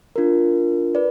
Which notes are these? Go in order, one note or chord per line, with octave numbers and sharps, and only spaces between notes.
D4 F4 A#4
B4 D5